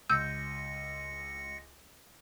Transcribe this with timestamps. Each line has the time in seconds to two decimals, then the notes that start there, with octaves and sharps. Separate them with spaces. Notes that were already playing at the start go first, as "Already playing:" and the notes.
0.10 C#2 E6 G6 A#6 C#7